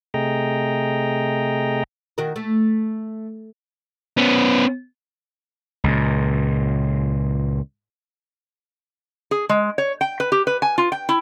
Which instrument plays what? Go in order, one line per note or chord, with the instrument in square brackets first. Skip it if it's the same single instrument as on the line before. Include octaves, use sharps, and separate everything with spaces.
[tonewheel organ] C3 A3 G#4 D#5 G5 A#5
[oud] D#3 F#4 A#4
A3
[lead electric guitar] B3 C#4
[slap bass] C#2 A#2
[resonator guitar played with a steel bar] G#4
G#3
C#5
G5
B4
G4
B4
G#5
F4
G5
E4